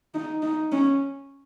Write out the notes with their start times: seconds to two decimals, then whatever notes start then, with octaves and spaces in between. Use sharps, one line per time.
0.14 D#4
0.42 D#4
0.72 C#4